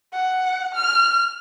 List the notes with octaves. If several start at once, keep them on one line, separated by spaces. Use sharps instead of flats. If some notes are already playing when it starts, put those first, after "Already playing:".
F#5
F6